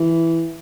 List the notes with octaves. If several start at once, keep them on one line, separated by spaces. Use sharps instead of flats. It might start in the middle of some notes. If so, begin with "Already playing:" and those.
Already playing: E3